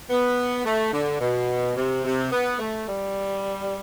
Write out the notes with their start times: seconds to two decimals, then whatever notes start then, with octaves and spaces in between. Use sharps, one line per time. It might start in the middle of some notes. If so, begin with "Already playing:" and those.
0.10 B3
0.65 A3
0.93 D3
1.21 B2
1.76 C3
2.05 C3
2.32 B3
2.59 A3
2.87 G3